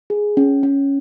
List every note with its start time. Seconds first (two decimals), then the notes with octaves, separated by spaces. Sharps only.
0.10 G#4
0.37 C#4
0.63 C#4